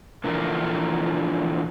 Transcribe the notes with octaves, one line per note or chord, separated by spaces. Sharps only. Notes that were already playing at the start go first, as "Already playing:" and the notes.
A#2 D3 E3 F3 D4 A#4